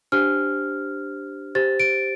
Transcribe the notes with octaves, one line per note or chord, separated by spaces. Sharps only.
D4 G4 C5 F6
G4 C5 A6
D7